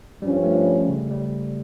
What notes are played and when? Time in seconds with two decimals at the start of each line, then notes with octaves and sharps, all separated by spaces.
0.21 G2 F3 G3 C#4
0.44 A3
0.66 G3
0.88 C#3
1.11 G3